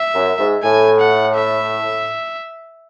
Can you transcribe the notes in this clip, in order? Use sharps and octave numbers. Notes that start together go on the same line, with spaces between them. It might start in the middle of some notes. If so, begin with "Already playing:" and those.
Already playing: E5
F#2
G#2
A2 G#5
F#5
E5